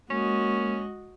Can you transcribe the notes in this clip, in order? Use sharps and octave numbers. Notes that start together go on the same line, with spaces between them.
G#3 A#3 C#4 F#4 D#5